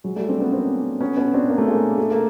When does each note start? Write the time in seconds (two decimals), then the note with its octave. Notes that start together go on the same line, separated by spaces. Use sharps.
0.04 F#3 G#3
0.16 G3 A3
0.28 C4 D4
0.40 B3 C#4
0.52 A#3 C4
1.00 B3 C#4
1.17 B3 C#4
1.34 C4 D4
1.49 A#3
1.58 A3
1.68 G#3 A#3
1.98 A3
2.11 A#3